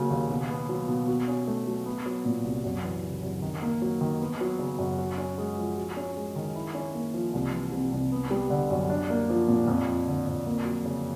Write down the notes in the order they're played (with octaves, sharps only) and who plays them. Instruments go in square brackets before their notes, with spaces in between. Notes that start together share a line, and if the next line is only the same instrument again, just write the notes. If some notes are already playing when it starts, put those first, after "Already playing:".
Already playing: [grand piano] C#3 F#3 A#3
D#2
B2
B3
F#3
B2
F#4
C#4
A3
F#3
B3
F#3
A#2
C2
F#2
E3
C#3
F#2
D#3
A#3
F#3
D#3
B3
F#3
C#3
F#2
F#4
C#4
G#3
F3
F#4
C#4
G#3
D#3
E4
C#4
A#3
F3
C2
E3
C3
C2
B3
G3
D3
F#2
D4
A#3
F3
A#2
F2
F3
D3
F2
A#3
F#3
C#3